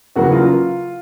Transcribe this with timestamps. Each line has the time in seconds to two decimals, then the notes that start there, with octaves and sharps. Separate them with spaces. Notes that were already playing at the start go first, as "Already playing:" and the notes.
0.16 E2 C#3 F#3 A#3 F#4
0.32 F4